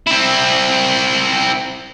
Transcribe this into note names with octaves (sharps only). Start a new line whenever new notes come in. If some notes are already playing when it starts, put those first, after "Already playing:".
C4 E4